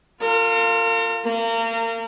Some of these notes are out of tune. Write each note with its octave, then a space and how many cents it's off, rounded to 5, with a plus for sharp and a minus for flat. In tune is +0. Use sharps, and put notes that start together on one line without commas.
F4 +0 A#4 -45
A#3 -35 A#4 -30